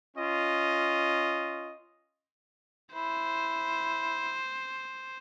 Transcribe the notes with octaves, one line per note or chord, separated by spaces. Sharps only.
C#4 F4 D#5
E4 C5